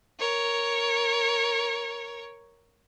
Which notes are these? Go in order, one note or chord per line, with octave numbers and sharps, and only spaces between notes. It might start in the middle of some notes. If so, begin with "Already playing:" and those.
A#4 C#5